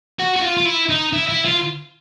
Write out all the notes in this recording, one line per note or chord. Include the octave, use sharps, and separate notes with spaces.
F#4
F#4
F4
F4
E4
D#4
E4
E4
F4